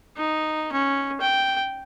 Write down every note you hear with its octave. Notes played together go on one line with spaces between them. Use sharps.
D#4
C#4
G5